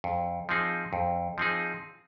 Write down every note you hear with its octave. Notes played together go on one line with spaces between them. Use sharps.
F2
F3 C4 D#4 G#4
F2
F3 C4 D#4 G#4